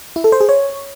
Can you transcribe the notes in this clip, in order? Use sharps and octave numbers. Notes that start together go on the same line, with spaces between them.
E4
A4
C5
G#4
C#5